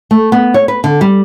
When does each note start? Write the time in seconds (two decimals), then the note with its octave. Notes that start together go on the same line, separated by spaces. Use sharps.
0.11 A3
0.32 B3
0.54 C#5
0.68 B4
0.84 D3
1.01 G3